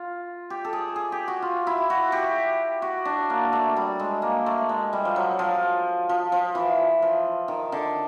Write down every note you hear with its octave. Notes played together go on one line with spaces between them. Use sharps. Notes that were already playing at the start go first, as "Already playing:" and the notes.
Already playing: F4
G4
A4
G#4
G#4
G4
F#4
F4
E4
F#4
G4
F#4
D4
A#3
A3
G3
G#3
A#3
A3
G#3
G3
F3
F#3
F3
F3
F3
E3
F3
D#3
D3